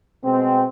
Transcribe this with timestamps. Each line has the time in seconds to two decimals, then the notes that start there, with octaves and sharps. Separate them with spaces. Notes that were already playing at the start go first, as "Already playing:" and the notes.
0.24 B2 G#3 C4